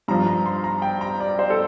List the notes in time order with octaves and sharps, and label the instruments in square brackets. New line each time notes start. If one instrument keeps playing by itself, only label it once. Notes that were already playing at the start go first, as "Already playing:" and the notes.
[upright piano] G2 F3 A#5
A#5
C6
A#5
G5
A#5
D5
C5
A4